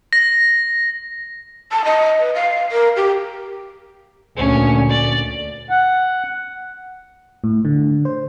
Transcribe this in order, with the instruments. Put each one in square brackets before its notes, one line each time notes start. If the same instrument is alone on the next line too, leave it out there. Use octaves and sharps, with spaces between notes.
[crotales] A#6
[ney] A5
D#5
B4
F5
A#4
G4
[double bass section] D2 A#2 [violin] C#4
[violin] D5
[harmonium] F#5
[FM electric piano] A2
D3
C5